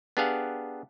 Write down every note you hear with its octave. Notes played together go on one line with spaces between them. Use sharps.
B3 D4 G4 G#4 F5 F#5